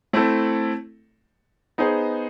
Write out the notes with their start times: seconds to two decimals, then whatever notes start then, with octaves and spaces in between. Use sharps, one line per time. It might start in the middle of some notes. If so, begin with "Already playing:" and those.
0.13 A3 C4 E4 A4
1.78 B3 D#4 G#4 C5